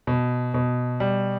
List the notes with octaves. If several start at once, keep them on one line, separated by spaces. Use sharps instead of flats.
B2
B2
G3